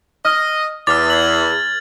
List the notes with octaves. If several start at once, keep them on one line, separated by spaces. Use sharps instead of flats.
D#5 D#6 F6
E2 D6 F6 A6 F7
G#6 F#7